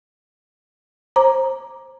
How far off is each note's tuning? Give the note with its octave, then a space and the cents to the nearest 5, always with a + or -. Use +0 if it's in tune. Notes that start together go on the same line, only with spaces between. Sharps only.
C5 +25 A#5 +0 D6 +0